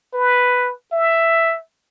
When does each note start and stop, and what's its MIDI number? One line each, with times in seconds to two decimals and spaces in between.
0.14 0.73 71
0.92 1.58 76